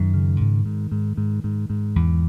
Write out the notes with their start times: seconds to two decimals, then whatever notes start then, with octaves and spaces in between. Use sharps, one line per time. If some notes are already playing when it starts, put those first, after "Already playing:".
Already playing: F#2 D#3
0.14 C#3
0.40 G#2
0.65 G#2
0.91 G#2
1.17 G#2
1.44 G#2
1.70 G#2
1.96 E2